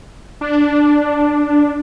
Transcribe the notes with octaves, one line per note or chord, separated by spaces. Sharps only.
D4